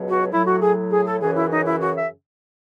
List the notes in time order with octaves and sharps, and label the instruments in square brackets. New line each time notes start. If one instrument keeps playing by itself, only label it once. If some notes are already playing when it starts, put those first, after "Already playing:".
Already playing: [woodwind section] C#2 B2 F#3
F#4
A2 F#3 E4
F#4
G#4
G#4
A4
F#2 C#3 E3 G#4
E4
D#4
E4
F#4
E5